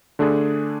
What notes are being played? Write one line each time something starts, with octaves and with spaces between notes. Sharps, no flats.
D3 A3 D4 G#4